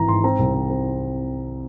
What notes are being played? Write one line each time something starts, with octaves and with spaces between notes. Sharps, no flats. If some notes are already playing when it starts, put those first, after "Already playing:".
Already playing: G#1 E3 A#5
G#2 C6
C4 A#5
C2
C4
C4